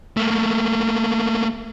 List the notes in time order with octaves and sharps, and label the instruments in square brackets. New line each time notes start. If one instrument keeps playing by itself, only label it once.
[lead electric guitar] A3 A#3